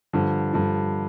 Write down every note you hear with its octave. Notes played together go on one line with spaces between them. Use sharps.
G2 D3 F3
G2 D3 F3